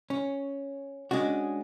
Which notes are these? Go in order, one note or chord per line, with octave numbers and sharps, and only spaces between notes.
C#4
G#3 C#4 D4 F#4